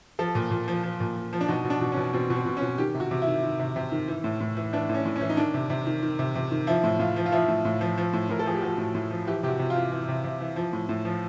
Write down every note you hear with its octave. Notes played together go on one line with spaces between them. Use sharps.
F3 A4
A#2
A#2
F3
F3
A#2
A#2
F3
D4
B2 D#4
B2
D4
B2
B2 C#4
B2 C4
B2 C4
B2
C#4
B2
D#3 G4
C3
F#4
C3
E4
D#3
D#3
C3
C3
D#3
E3
A2
A2
E3
E3 D4
A2
C#4
A2
C#4
E3
D#4
D#3 D4
C3
C3
D#3
D#3
C3
C3
D#3
F3 E4
A2
A2 F4
F3
F4
F3 E4
A2
A2
F3
F3
A2
A2 A#4
A4
F3 G#4
G4
F3 F#4
A2
A2
F3
E3 G4
C3 G4
F#4
C3
F4
E3
E3 E4
C3
C3
E3
F3
A2
A2
F3